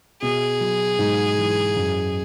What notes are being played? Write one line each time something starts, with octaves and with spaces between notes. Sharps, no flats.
B2 G#4
F#3
G#2
E3
F#2